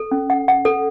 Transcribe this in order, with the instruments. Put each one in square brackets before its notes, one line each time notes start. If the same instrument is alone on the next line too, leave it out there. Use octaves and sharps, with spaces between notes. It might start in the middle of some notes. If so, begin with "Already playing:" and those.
Already playing: [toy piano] A4
C#4
F#5
F#5
A4